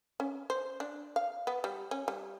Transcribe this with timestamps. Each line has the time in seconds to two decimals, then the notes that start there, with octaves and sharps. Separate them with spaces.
0.20 C#4
0.50 C5
0.80 D4
1.16 F5
1.47 B3
1.64 G3
1.91 C#4
2.08 G3